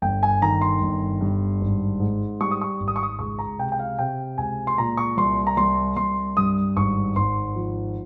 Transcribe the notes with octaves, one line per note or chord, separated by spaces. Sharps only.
G1 G5
G#5
D#3 A#5
C6
G1
G2
G#1
G#2
G3 C#6
D#6
C#6
G#1
D#6
C#6
D#6
C#2 C#6
A#5
C3 G5
G5
F5
C3 G5
C#2 G#5
C6
A#2 A#5
C#6
C2 C6
A#5
C2 C6
C2 C6
G2 D#6
G#1 C#6
G#1 C6
F3